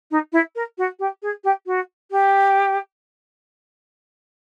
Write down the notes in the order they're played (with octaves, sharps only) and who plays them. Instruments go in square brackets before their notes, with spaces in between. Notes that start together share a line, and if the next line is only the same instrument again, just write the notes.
[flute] D#4
E4
A#4
F#4
G4
G#4
G4
F#4
G4